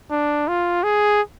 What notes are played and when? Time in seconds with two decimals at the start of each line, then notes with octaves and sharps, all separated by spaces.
0.11 D4
0.48 F4
0.83 G#4